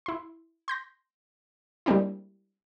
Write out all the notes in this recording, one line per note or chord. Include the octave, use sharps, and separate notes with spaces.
E4 C6
C6 G6 A#6
G3 G#3 A#3 C4 D4 E4